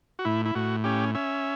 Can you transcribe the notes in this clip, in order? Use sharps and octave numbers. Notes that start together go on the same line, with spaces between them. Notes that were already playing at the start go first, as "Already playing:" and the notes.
F#4
A2 E4
E4
A2 F#4
C#4 G4
C#4 E5